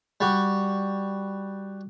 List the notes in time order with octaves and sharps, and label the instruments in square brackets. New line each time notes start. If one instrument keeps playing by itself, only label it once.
[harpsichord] G3 F#4